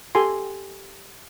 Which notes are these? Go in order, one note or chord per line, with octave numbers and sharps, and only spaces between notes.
G4 A4 G#5 C6